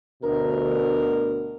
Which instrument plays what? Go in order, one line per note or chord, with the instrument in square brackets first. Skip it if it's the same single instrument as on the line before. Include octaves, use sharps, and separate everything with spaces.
[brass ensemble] D2 B2 [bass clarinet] A#4